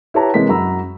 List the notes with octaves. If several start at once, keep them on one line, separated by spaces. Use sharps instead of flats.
E4 G4 B4 C#5 A5 A#5
C3 E3 G#3 A#4 B6
F#2 F#4 A#5 B5 E6